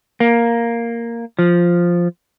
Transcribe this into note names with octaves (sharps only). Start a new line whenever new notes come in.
A#3
F3